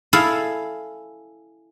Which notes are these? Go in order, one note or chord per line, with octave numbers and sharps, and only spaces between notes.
E4 G#4 A4 F5